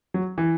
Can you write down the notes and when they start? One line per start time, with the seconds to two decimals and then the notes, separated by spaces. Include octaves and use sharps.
0.14 F#3
0.38 E3